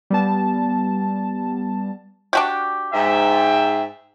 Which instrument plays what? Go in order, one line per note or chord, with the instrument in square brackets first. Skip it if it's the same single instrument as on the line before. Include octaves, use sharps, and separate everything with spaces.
[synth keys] G3 B3 A5
[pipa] D4 F#4 G4
[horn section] G#2 E5 G5